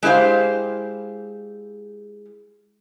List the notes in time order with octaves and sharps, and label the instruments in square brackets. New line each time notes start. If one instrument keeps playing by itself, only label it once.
[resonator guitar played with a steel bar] G#3 E4 G4 C5 F5